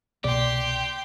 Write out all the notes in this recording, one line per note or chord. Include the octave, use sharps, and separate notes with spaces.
C2 B2 A#3 G4 D5 G5 C6